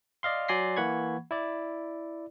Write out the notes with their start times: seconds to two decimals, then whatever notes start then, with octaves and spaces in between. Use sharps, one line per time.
0.23 D5 D#5 F5 C6
0.48 F#3 D5 G#5 C6 A#6 C7
0.77 E3 A#3 F#5 B5 C#6 G#6
1.31 E4 D5